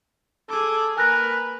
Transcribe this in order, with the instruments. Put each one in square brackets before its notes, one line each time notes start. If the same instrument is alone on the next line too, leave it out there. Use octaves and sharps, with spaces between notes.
[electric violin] G#4 D6 [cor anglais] A4
[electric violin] A#3 B4 [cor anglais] A#4 [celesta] G#5 F#6 A#6